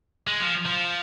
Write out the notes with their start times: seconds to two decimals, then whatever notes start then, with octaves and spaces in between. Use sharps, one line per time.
0.27 G#3
0.40 F3
0.66 F3